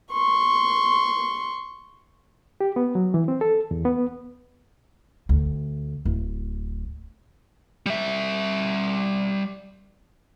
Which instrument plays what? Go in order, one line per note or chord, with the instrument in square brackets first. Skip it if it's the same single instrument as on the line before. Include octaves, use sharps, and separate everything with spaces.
[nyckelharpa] C6 C#6
[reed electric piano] G4
B3
F#3
E3
C4
A4
E2
B3
[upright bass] D2
D1
[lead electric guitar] G3 E5